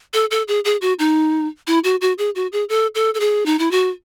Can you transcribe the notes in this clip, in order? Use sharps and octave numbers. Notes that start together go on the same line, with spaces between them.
A4
A4
G#4
G#4
F#4
D#4
E4
F#4
F#4
G#4
F#4
G#4
A4
A4
A4
G#4
D#4
E4
F#4